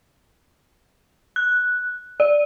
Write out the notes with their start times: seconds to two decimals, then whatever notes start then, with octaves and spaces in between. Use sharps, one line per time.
1.36 F#6
2.20 D5